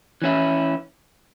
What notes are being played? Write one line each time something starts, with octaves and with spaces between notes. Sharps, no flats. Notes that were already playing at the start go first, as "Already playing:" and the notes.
E3 C#4 E4